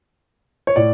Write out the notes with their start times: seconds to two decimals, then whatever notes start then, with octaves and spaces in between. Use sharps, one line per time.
0.67 C#5
0.76 A2 D5